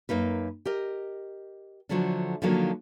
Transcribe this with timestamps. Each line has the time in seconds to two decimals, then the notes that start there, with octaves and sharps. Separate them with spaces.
0.09 F#2 A#3 D#4 B4
0.65 G4 A#4 D#5
1.89 D3 F3 F#3 A3 D4
2.42 D3 D#3 F3 F#3 A#3